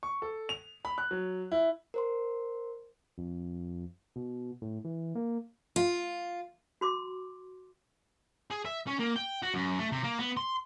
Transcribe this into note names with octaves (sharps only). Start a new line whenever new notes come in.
C#6
A4
F7
B5
F#6
F#3
E4
A#4 C5 C6
F2
B2
A2
E3
A#3
F4
F#4 C6 D6
G#4
E5
C#4
A#3
G5
F#4
F#2
A3
C3
A#3
B3
C6